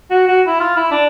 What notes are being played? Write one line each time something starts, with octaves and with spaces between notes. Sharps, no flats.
F#4
F#4
E4
F4
E4
D4